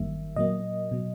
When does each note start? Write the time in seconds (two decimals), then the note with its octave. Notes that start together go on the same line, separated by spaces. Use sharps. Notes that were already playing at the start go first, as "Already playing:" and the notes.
Already playing: G1 F#2 D#3 G3 A#3 E5
0.36 A#2 F#3 A#3 D#5
0.91 B2 F#3